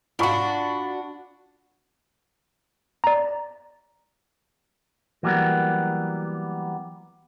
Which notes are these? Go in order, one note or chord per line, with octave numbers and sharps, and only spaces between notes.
D4 F4 F#4 B5 C#6
D5 A#5
E3 F#3 G3 A#3 B3